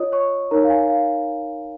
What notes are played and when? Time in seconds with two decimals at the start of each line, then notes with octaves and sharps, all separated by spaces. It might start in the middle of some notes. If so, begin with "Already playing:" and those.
Already playing: F4 C#5 D#5 D#6
0.12 C#5 C#6
0.51 D#4 A#4 C#5 A#5
0.64 F5
0.70 G#5
0.89 F5